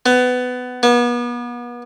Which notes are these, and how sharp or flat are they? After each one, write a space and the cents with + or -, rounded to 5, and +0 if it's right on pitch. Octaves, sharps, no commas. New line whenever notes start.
B3 +20
B3 -35